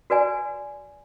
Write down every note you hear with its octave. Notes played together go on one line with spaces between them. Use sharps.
F#4 B4 D5 G#5